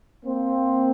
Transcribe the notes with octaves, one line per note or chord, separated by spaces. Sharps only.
A#3 C4